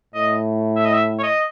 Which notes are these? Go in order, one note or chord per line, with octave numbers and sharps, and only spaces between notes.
A2 D#5
E5
D#5
E5
C#5
D#5